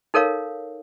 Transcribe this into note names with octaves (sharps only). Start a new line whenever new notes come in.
D#4 A4 A#4 C#5 F5